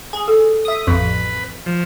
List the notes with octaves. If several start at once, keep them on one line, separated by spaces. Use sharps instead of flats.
G#4
A4
E5 D#6
A1 F2 B4
F3